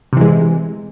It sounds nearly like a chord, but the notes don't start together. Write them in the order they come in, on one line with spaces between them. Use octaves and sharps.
C3 E3 G#3